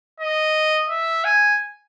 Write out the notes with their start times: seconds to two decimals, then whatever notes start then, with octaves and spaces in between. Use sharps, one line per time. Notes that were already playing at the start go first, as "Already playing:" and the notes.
0.20 D#5
0.90 E5
1.24 G#5